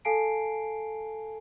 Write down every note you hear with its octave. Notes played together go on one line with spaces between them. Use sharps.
A4 F5 G#5 A5 C7 D7